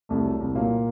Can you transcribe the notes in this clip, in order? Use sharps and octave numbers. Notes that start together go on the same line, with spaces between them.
C2 A3
F#3
C2
A3
A#2 F#3 A#3